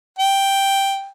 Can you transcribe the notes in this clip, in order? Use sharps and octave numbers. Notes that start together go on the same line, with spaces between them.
G5